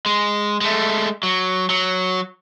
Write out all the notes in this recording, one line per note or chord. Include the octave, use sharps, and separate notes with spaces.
G#3
G#3 A3
F#3
F#3